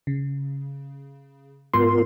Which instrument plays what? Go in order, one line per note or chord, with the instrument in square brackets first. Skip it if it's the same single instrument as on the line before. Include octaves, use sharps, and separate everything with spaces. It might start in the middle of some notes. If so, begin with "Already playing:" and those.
[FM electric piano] C#3
[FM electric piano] G#2 C6 [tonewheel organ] B3 F4 A#4